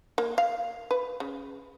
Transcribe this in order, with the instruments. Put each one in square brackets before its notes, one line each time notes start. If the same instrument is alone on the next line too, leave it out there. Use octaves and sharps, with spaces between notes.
[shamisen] A#3
F5
B4
C#3